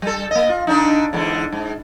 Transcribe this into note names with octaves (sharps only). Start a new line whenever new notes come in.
G3 A4
A#3 D#5
F4
D3 D4 D#4
E2 G#2 D3
G#2